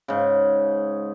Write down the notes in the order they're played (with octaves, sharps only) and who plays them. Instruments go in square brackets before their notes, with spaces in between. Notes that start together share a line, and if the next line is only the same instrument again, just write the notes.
[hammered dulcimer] G#2 C#3